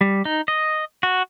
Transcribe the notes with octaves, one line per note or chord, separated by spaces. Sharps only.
G3
D#4
D#5
F#4